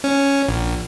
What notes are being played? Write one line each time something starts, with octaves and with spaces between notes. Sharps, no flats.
C#4
A#1